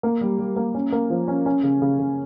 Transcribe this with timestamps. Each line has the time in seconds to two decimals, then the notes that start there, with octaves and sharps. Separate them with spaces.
0.03 A#3
0.21 G3
0.39 G3
0.56 A#3
0.74 C#4
0.92 A#3
1.10 F3
1.28 C#4
1.46 C#4
1.63 C#3
1.82 C#3
1.99 C#3